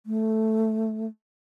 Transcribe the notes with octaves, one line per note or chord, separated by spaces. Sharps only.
A3